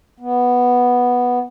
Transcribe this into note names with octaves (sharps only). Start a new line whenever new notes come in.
B3